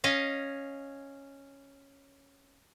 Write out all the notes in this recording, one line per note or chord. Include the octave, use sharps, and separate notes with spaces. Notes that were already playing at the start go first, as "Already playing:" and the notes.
C#4 D#5 F5